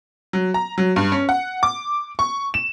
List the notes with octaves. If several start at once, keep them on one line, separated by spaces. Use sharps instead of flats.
F#3
A#5
F#3
G2
C#4
F#5
D6
C#6
E7